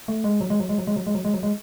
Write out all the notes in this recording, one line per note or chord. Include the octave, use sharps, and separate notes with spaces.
A3
G#3
F#3
G#3
F#3
G#3
F#3
G#3
F#3
G#3
F#3
G#3
F#3
G#3